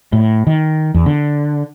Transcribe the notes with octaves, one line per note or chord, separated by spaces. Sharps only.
A2
D#3
E2
D3